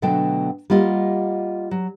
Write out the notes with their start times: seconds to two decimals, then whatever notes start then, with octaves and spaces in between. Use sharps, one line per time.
0.02 B2 D3 F#3 A3 D4 G5
0.70 G3 A#3 F4 D#5 F#5
1.71 F#3